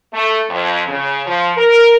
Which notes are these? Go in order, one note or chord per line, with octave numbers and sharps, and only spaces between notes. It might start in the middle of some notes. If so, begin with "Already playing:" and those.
A3
F2
C#3
F3
A#4